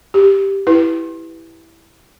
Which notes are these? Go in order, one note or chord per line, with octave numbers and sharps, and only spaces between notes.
G4
E4 B4